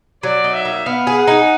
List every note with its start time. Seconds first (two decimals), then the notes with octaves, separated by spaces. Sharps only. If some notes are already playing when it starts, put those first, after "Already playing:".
0.23 F#3 D5
0.44 D#4
0.55 E5
0.65 A#3
0.86 B3 F5
1.07 G#4
1.17 F#5
1.27 D#4